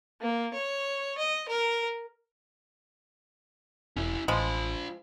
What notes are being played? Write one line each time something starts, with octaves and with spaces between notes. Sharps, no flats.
A#3
C#5
D#5
A#4
E1 C#4 E4
A1 F3 G#3 F4 B5